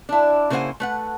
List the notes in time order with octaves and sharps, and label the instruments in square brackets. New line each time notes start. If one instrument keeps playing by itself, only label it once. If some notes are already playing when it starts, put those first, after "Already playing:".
[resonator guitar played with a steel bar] D4 E4
C#3 A#3 E4 C5 F#5 G#5
A3 B4 F#5